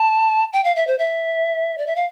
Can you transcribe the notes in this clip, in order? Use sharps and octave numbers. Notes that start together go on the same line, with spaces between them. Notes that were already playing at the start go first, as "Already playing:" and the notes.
Already playing: A5
G5
F5
E5
C5
E5
D5
E5
F5